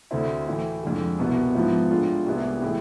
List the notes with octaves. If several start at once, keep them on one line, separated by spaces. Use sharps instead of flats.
D2 D3 A3 C4 E4
A2 E3 A3
F2 D3 G#3
C2 B2 B3 E4
G#2 F3 B3 E4
A2 G#3 D4 F4
C2 C3 G#3 B3 E4
A2 E3 G#3